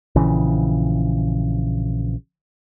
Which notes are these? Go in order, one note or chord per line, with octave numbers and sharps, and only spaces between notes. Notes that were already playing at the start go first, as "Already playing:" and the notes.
A#1 C#3 E3